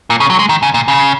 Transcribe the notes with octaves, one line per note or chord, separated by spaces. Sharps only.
A#2
C#3
F#3
G#3
D#3
C#3
A#2
C#3